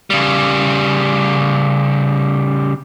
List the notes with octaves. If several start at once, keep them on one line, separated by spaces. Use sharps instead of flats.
C#3 G3